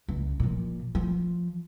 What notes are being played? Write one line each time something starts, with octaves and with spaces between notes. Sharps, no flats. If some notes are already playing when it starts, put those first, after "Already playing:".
C#2
A#2 F3
F3